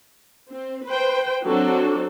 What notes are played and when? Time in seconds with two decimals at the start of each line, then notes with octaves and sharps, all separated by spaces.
0.49 C4
0.86 B4 C5 G5
1.45 F#3 C4 D4 F#4 A4